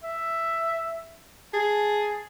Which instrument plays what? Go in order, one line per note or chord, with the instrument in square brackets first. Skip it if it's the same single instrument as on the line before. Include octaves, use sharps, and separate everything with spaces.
[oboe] E5
[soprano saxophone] G#4 [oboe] A5